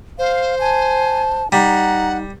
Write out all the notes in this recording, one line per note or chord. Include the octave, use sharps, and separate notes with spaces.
C5 F5
G#5 A5
G3 D#4 F#5 A#5